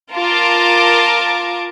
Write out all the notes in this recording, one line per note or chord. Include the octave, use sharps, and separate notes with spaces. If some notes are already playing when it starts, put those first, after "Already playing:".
F4 A#4 A5 D6